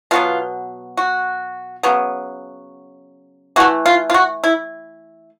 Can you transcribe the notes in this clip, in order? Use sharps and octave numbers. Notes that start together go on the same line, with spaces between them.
B2 F#3 B3 F4
F#4
C#3 F#3 B3
E3 A3 F#4
F4
F4
F#4
E4